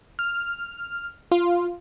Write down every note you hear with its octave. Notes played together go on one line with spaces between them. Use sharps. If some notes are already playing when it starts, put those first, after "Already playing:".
F6
F4